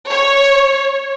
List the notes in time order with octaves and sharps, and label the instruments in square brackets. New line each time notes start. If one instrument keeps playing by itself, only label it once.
[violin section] C#5